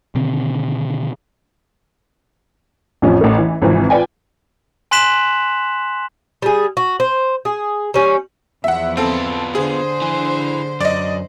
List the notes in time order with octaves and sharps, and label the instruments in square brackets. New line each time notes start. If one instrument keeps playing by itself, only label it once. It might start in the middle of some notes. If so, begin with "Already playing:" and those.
[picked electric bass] B2 D3 D#3 C4
[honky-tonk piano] A1 F2 F3 C#4
A1 A3
E3
G#1 C3 E3 F3
F4 B4 D5 G5 G#5
[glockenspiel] G#5 C6 F#6 B6 E7 F#7
[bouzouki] G3 G#4
F#4
C5
G#4
G3 C#4
[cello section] E2 F3 E4 [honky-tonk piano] E5 F#5
[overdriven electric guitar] B3 F4 [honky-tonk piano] C4 A4
[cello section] D3 C5 [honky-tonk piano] G#4
[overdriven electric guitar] E4 G#5
[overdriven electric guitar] F#2 [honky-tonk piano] D5 D#5